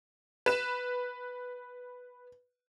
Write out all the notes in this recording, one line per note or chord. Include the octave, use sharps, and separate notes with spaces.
B4 E7